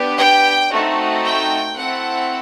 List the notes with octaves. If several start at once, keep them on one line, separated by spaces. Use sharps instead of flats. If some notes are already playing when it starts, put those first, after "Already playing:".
Already playing: B3 D4 G4
G5
A3 C4 D#4 F#4
G5
A3 C4 E4 A4 F#5